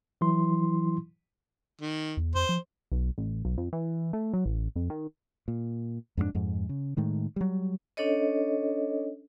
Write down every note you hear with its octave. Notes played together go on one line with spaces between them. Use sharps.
E3 F#3 E4 C6
D#3
E2
F2 C5
F3
B1
A1
B1
F2
E3
A3
F#3
A1
F2
D#3
A#2
F2 G#2 A3 D4
F2 G#2
C#3
A2 D#3 G#3
F#3 G3
C#4 D4 A4 C#5 D#5